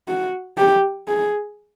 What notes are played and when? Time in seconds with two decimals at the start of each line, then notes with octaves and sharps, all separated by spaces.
0.08 F#4
0.58 G4
1.08 G#4